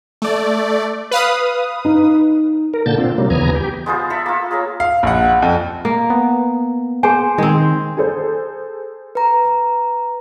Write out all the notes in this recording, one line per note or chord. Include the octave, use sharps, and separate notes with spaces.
A3 D5
B4 F5 D#6
D#4
A#4
A#2 D3 A#3 A5 G6 A6
C4 D4 F4
C3 F#3 G3 A#3
D#2 C#3 E3 B3 G#5 A#5
G4
G#3 B3 F4 C5
A4 E5 B5
A#3 F4
G#4 A#4 C#5 F5
F5
A#1 F#5
F2
A#3
B3
G#4 C5 G#5
D#3 G#3 C4
G#4 A4 C5
B4 A#5